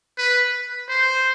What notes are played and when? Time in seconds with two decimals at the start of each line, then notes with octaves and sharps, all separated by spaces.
0.18 B4
0.89 C5